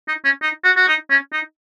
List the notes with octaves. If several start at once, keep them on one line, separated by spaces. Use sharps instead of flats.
D#4
C#4
D#4
F#4
F#4
D#4
C#4
D#4